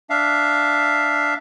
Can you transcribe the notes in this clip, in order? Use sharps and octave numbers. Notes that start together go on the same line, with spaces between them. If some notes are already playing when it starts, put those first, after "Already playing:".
D4 E5 F5